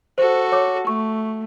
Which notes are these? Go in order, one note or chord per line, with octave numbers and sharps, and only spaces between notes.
F#4 A4 C5
C#5 D6
A3 C#6